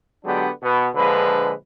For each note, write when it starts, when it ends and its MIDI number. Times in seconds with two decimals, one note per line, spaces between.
0.25 0.49 50
0.25 0.49 54
0.25 0.49 56
0.25 0.49 59
0.25 0.49 62
0.25 0.49 67
0.63 0.88 47
0.63 0.88 59
0.95 1.52 34
0.95 1.52 50
0.95 1.52 53
0.95 1.52 56
0.95 1.52 71